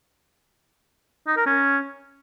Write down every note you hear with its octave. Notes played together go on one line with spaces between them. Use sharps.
D#4
A#4
C#4